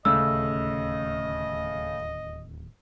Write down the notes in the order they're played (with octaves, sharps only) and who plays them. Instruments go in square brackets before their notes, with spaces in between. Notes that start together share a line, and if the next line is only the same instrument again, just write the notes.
[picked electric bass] D1 D#2 C#4 [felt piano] C#3 A3 [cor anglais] D#5 [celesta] E6